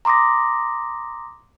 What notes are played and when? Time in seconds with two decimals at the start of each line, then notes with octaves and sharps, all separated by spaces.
0.05 A#5 C6 D6 D#6 A#6